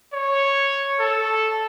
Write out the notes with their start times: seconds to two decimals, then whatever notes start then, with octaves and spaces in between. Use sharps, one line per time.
0.14 C#5
1.00 A4